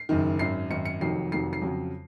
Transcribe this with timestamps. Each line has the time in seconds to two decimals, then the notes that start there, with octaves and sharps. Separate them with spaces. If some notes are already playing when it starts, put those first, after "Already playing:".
Already playing: C7
0.09 F#1 F#2 D#3
0.39 G#1 F#2 D#3 C7
0.70 G#1 F#2 D#3 C#7
0.85 C#7
1.01 F1 F2 D#3 F#3 C7
1.32 F1 F2 D#3 F#3 C7
1.53 C7
1.62 F2 C#3 F#3